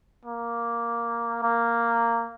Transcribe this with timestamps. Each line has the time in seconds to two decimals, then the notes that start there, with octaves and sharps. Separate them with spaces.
0.25 A#3
1.43 A#3